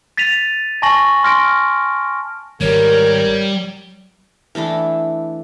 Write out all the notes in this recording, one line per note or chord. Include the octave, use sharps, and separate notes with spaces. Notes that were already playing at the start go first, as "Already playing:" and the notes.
A6 B6 D#7 F7
G#5 A5 C#6 A#6 F#7
C6 F6 A#6 D7
G#1 G3 A#4 C#5
E3 A3 D4 E4